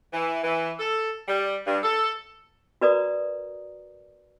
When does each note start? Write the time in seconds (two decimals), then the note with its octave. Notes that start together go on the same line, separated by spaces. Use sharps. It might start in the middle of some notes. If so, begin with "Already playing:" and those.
0.13 E3
0.44 E3
0.79 A4
1.28 G3
1.66 G2
1.84 A4
2.81 F#4 A#4 B4 D5 A#5 D#6